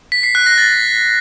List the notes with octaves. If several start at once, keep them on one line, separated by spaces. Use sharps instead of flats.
B6
C7
F#6
A#6
A6